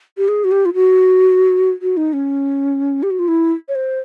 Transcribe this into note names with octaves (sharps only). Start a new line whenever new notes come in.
G4
G#4
F#4
G4
F4
F#4
F#4
D#4
C#4
G4
F#4
F4
E4
C#5
C5